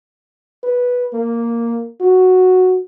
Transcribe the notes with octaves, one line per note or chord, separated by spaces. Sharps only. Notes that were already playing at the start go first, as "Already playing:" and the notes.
B4
A#3
F#4